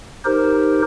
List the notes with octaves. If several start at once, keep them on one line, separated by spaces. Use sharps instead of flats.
D#4 G4 A#4 C5